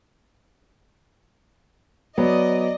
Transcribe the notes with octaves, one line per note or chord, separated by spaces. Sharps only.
F#3 B3 D5 D#5